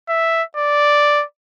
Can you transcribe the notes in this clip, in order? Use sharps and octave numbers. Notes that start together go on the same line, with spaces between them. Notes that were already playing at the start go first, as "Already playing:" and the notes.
E5
D5